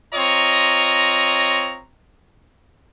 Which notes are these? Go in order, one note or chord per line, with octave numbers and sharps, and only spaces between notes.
C4 F4 C#5 D#5 A#5